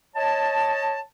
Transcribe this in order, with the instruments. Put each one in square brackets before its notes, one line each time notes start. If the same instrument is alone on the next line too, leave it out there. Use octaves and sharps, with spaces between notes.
[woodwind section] C#5 D#5 A5